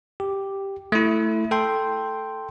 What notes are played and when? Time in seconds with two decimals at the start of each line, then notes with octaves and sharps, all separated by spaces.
0.20 G4
0.92 A3 E4
1.51 A4 G5 C6